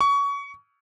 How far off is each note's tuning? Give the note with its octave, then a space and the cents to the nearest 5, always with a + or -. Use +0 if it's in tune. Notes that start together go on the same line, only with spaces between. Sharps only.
C#6 +25